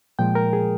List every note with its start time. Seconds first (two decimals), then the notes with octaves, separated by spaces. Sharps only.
0.19 A#2 F3 G#3 G5
0.35 A#4
0.53 G#4